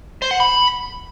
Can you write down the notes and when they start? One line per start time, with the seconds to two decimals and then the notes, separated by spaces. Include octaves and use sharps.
0.22 C5
0.31 F#5
0.40 B5